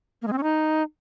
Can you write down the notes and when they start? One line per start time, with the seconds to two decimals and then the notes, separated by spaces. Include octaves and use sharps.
0.22 A#3
0.27 G#3
0.33 C4
0.38 C#4
0.43 D#4